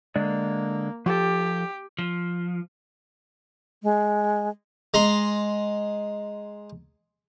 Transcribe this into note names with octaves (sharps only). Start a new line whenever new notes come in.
D3 G#3 A#3 D5
F3 G4 A4
F3
G#3
G#3 A#5 C6